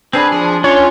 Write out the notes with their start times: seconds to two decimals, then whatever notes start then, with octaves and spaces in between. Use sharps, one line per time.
0.13 C4 D4 G#4 B4 B5
0.32 F3 G#4
0.64 C#4 D4 F4 C#5 C6